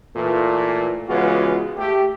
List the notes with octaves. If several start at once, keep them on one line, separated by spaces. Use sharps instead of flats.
A#2 E3 A3
C#3 E3 G#3 B3 F4 F#4
A3 G4